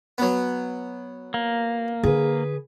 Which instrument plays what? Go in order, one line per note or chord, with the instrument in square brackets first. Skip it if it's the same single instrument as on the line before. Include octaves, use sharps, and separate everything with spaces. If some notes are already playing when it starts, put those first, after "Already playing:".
[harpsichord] F#3 B3
[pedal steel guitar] A#3
[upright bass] D3 [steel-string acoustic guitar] G#4 B4